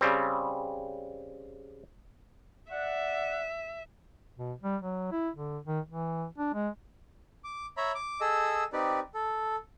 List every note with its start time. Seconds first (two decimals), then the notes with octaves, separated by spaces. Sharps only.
0.01 C#3 G3 C4
2.71 D5 E5 F#5
4.37 B2
4.63 G3
4.82 F#3
5.12 E4
5.35 D3
5.66 D#3
5.88 E3
6.38 D4
6.54 G#3
7.44 D6
7.77 C#5 E5 A#5 B5
7.95 D6
8.21 G#4 A4 D#5 E6
8.73 C4 D#4 G4 B4 D5
9.14 A4